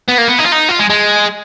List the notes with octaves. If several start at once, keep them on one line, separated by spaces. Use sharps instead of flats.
B3
A#3
B3
D#4
F4
D#4
F4
G#3
G#3